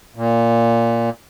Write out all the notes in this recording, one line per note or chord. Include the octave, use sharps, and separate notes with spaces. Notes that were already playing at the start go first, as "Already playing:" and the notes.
A#2